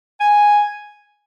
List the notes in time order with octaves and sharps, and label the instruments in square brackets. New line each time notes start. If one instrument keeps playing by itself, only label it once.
[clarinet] G#5